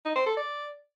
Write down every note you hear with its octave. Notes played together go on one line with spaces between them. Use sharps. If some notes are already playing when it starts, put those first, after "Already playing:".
D#4
C5
A4
D5